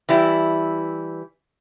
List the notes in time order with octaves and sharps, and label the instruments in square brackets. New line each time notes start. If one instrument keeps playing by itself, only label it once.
[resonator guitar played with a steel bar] E3 G3 E4